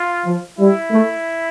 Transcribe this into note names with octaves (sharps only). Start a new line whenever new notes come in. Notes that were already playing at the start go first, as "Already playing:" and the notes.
Already playing: F4
F3
G3 E4
A3